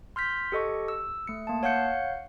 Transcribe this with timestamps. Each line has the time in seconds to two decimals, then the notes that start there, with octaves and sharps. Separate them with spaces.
0.16 C6 F6 G6 B6
0.52 G4 A4 D#5 C#6
0.88 E6
1.27 A3 C#7
1.47 A#3 A5
1.63 C#5 F5 F#5 G6 C#7